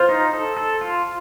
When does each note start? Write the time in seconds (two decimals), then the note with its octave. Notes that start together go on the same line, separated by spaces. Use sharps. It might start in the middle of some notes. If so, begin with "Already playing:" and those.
Already playing: F4 C5
0.09 D#4
0.33 A4
0.57 A4
0.81 F4